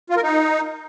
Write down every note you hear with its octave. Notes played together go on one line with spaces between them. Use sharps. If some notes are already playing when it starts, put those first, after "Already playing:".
F4
A#4
D#4